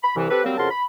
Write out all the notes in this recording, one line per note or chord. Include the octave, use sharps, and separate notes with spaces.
B5
C2 E3
C4 G4 A4 B4
F#3 G3 A#3 C4
F2 C#3 F#4 A#4 A5 C6
B5